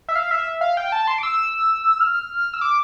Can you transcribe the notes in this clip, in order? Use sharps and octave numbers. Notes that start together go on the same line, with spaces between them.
E5
F5
E5
F5
G5
A5
C6
D6
E6
F6
E6
D6